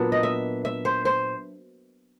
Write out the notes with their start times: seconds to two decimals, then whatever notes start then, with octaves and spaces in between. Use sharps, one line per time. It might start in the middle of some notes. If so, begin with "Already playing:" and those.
Already playing: A#2 F#3 B3 D4
0.12 D#5
0.23 E5
0.65 E5
0.85 C5
1.05 C5